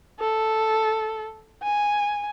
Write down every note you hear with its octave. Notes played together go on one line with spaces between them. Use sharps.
A4
G#5